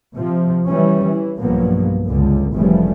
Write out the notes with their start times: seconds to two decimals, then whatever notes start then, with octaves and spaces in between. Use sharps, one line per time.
0.14 C3 F3
0.67 E3 G3 C#4
1.05 E3
1.39 B1 G2 F3 F#3 A#3 B3
2.07 C#2 D3
2.54 F1 C#3 E3 F3 G3 A3